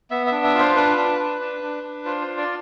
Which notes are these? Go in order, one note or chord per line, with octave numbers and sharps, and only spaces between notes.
B3 E5
E5
D4
E5
F4
C5
D4 B4
D4
D4
D4
D4
D4
F4 C5
C5
D4
D5